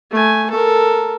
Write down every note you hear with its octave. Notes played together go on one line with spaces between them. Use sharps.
A3 G#5
A4 A#4